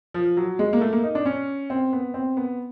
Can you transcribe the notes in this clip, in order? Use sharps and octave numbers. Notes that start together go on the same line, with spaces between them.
F3
F#3
G#3
A#3
A3
A#3
D#4
D4
C#4
C4
B3
C4
B3